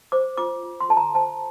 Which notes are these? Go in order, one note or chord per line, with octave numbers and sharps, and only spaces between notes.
C5 D6
F4 D6
F4
C6
A4 A5
A#5
C5 A5